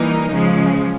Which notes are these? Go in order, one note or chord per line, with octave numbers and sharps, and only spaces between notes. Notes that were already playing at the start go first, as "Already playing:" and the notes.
Already playing: E3 G3 A#3 D#4
C#3 F3 G#3